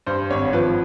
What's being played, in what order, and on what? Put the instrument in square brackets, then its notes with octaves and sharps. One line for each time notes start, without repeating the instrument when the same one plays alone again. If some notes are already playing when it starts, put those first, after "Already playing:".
[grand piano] G2 C5
G#1 C#5
F3 B4